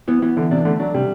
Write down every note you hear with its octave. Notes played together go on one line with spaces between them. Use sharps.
E3 B3
E3 B3
D3 E3
C3 D4
D3 A3
F#3 D4
C3 G3